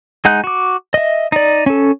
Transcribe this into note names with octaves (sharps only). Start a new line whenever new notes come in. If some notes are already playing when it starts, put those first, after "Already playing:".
G#3 D#4 F#5 F#6 G6
F#4 D6
D#5 E5
D#4 D5
C#4 A4